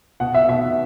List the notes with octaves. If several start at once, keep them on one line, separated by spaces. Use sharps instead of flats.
B2 F#5
E5
B2 E5